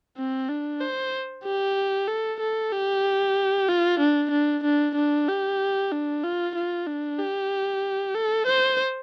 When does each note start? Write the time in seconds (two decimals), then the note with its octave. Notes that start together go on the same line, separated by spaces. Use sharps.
0.17 C4
0.49 D4
0.80 C5
1.44 G4
2.08 A4
2.40 A4
2.72 G4
3.69 F4
4.00 D4
4.31 D4
4.63 D4
4.95 D4
5.28 G4
5.92 D4
6.24 F4
6.55 F4
6.87 D4
7.19 G4
8.15 A4
8.47 C5